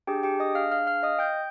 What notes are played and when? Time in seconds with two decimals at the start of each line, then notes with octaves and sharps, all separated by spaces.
0.07 D4 G4 G#4 G5
0.23 G4 G5
0.40 D#5 D#6
0.55 F5 F6
0.72 F5 F6
0.87 F5 F6
1.03 D#5 D#6
1.19 G5 G6